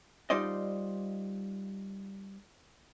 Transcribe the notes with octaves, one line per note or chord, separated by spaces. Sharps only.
G3 D#4 F4 C5 D5 D#5